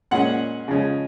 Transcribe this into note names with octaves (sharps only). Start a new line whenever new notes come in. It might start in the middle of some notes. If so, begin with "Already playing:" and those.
A#2 G#3 C#4 F#5
C#3 F3 G#3 C#4